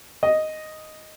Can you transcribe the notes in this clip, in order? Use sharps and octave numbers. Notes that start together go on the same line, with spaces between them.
D#5